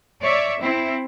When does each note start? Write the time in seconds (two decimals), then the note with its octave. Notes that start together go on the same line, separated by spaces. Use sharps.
0.21 C#5 D5 E5
0.60 C4 E4